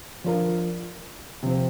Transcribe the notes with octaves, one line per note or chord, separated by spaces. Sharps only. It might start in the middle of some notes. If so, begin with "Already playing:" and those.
F3 D4 F4 A#4
C3 F3 C4